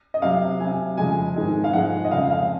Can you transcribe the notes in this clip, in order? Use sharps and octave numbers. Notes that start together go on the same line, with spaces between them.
D#5
C3 F#3 F5
C3 F#3 G#5
F2 C#3 F3 G#3 G#5
G#2 D#3 G#3
F5
G#2 F3 G#3 F#5
D#5
F2 C#3 G#3 F5
F5